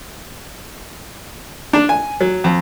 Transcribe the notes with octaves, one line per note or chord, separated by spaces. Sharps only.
D4
G#5
F#3
F2